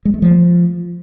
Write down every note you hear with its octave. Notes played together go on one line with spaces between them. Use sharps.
G#3
A3
F3